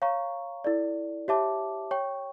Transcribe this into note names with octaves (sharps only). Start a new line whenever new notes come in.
C#5 F5 A#5 C#6
E4 A4 D5
G4 C#5 E5 A5 D6
C#5 G5 C#6